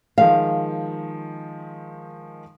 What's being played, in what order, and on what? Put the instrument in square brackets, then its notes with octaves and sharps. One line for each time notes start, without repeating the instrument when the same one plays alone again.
[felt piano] D#3 F3 G#3 [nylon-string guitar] F5